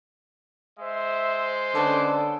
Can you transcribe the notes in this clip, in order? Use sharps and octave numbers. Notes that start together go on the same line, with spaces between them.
G#3 C5 E5
D3 B3 C#4 A4 D6